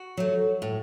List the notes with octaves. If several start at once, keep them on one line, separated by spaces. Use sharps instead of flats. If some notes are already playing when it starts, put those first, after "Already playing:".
Already playing: F#4
F#3 A3
A2